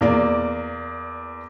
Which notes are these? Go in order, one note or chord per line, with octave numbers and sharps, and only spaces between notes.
E2 A#3 D5